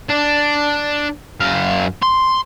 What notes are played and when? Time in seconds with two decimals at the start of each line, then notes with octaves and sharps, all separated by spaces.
0.09 D4
1.40 F#2 F5
2.02 C6